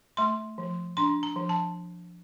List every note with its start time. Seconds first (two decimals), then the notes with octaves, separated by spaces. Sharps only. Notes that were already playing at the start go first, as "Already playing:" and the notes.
0.17 A3 C6
0.58 F3
0.97 D4 C6
1.23 A#5
1.36 F3
1.49 A5